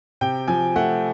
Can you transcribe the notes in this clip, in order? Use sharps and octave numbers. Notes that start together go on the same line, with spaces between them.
C3 G5
F3 G#5
A3 F#5